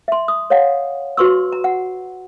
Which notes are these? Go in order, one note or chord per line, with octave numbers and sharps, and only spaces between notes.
E5 C6
D#6
C#5 D#5 F5 F#5
F#4 B4 C6 C#6 E6
A#5
F#5